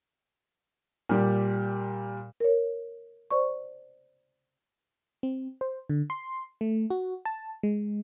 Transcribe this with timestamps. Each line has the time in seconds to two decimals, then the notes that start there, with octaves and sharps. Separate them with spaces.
1.09 A#2 G3 G4
2.40 A#4 C#5
3.31 C5 D5 C#6
5.23 C4
5.61 C5
5.89 D3
6.10 C6
6.61 A3
6.90 F#4
7.25 A5
7.63 G#3